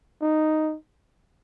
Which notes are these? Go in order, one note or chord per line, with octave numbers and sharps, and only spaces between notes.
D#4